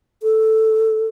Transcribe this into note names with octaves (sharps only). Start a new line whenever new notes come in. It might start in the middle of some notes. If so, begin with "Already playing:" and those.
A4